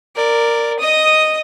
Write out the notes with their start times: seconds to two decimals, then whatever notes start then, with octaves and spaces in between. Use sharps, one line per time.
0.16 A#4 D5
0.79 D#5 D#6